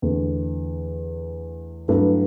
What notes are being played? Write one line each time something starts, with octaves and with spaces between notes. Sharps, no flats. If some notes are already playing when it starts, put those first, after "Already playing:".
E2 D3 A3
G2 F#3 A3 E4 B4